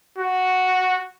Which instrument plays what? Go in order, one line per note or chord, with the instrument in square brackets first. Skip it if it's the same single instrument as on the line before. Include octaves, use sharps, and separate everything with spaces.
[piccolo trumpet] F#4